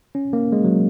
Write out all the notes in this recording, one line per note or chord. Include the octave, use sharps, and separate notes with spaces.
C#4
A#3
G#3
F#3